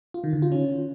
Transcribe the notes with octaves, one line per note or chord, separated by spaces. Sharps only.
F4
D#3
D3
F4
C#4